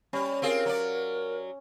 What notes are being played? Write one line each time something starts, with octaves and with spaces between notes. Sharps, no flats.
G3 C#4
C4 F4 G#4 A#4
F#3 D5